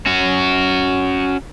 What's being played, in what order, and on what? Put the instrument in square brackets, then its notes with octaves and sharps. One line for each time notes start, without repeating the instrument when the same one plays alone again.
[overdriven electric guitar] C#4 F#4